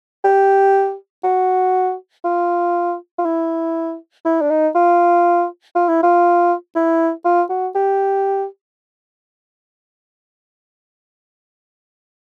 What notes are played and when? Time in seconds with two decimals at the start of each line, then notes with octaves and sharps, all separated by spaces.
0.24 G4
1.24 F#4
2.24 F4
3.19 F4
3.25 E4
4.25 E4
4.41 D4
4.50 D#4
4.75 F4
5.76 F4
5.88 E4
6.03 F4
6.75 E4
7.25 F4
7.50 F#4
7.75 G4